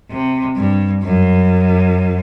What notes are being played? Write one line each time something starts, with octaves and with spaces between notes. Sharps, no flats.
C3
G2
F#2